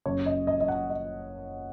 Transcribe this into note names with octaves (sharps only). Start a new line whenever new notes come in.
F#1 F#2 C#3 C#5
D#5
D#5
D#5
F#5
D#5